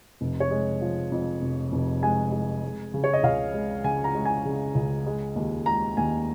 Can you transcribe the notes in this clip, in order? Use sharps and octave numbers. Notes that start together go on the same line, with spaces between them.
F1
C#5
G#3
F3
F2
F1
F1
G#3 G#5
G#3
G#3
C#3
C#5
D#5
C#2 F5
G#3
C#3 G#5
A#5
G#3
G#5
C#3
C#2
G#3
D#2
G#3 A#5
D#2 G#5